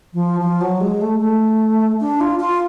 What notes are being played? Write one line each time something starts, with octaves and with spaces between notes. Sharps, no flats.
F3
F3
F#3
G#3
A3
A3
D4
F4
F4